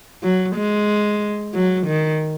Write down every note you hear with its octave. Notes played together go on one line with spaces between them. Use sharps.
F#3
G#3
F#3
D#3